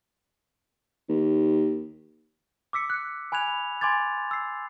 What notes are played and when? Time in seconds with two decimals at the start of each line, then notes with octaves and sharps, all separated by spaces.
1.09 D#2
2.73 D6 E6 B6 C#7
2.90 F#6 C#7
3.32 G#5 B5 F#6 G#6 F7
3.48 B5
3.81 G#5 C6 D6 G#6 A6
4.31 E6 C7